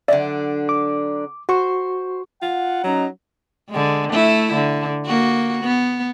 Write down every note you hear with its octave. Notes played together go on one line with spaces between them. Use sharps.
D3 F#3 D4 D5 E5
D6
F#4 C5 C#6
F4 F#5
F#3 C#4 D#4 A#5
D3 G#3
A3 E4
D3
A#3 F#4
B3